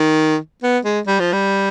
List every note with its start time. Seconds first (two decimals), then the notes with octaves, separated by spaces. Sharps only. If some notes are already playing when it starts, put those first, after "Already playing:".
Already playing: D#3
0.63 B3
0.85 G#3
1.07 G3
1.20 F3
1.33 G3